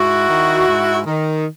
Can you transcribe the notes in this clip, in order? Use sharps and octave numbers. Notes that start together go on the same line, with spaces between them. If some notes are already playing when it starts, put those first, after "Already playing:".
Already playing: G#2 E4 F#4
D#3
G#2
D#3